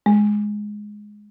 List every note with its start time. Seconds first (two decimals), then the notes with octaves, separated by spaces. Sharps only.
0.06 G#3